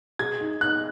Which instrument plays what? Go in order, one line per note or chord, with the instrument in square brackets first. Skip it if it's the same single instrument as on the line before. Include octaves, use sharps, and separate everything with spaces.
[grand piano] G#4 [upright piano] G#6
[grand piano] D#4
[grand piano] D#4 [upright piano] F#6